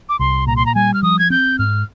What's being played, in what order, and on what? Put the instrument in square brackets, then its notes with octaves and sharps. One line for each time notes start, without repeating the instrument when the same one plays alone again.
[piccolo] D6
[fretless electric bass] C2 [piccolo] C6
[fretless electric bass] A#2 [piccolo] A#5
[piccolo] C6
A#5
[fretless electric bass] G3 [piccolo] G#5
[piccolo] F6
[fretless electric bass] F3 [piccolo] D#6
[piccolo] G#6
[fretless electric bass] C4 [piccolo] G6
[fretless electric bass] G#2 [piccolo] F6